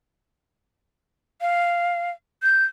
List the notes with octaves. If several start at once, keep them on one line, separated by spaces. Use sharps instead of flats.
F5
G6